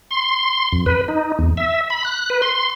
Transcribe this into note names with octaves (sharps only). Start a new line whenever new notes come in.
C6
F2
B4
D#4
E2
E5
B5
F#6
B4
C6